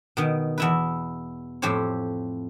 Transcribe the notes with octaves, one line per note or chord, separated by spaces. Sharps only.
B2 D#3
E2 E4 B4
F2 A2 G4 C5 C#5